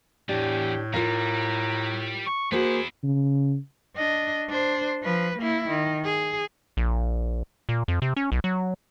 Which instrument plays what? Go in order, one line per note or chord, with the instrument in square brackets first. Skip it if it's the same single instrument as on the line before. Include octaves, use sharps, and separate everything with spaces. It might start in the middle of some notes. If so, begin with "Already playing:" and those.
[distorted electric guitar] E2 [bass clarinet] A2 [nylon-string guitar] D4 [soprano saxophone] G4
[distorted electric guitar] G3 [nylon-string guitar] F4 A#4 F5 [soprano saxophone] A#5
[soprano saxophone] C#6
[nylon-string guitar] A#3 F#4 [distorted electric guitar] B3 E4 [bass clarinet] G#4 [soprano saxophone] C5
[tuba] C#3
[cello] D4 D#5
D4 C5
F3 B4
A#3 E4
D#3
G#4
[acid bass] A#1
A#2
F2
C3
C#4
B1
F#3